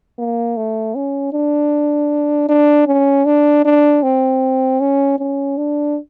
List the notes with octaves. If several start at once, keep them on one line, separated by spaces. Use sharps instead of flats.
A#3
A3
C#4
D4
D4
C#4
D4
D4
C4
C#4
C#4
D4